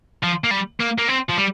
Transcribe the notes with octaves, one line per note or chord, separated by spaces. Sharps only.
F3
A#3
G3
A#3
A#3
C4
F3
G3